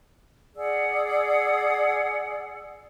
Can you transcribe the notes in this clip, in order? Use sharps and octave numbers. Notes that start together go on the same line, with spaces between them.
G#4 D5 F#5 E6